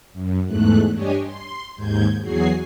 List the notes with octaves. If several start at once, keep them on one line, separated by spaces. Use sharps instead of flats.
F#2
E2 G#2 A3 F#6
G2 D4 G4 C#5 D#5 G#5
C6
D#2 G#2 G6 G#6
E2 F#3 F#4 G#4 G#5 C7